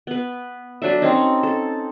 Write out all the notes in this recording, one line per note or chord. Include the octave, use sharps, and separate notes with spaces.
B3 B4
F#3 D4 A4 E5
C4 C#4 D#4
A4